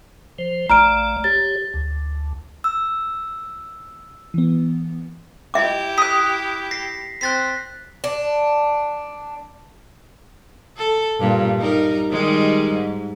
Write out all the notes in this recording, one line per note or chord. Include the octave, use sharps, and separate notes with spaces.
F3 C5
A#1 A3 D5 A#5 F6 D7
G4 C#5 A6
D2
E6
E3 B3
E4 G4 D#5 E5 D6
D#6 F#6 B6
A#6 C7
C4 F#6 A6 B6
D4
A4
G2 A#2
G3 D#4 A#4
D#3 G3 G#3
G#2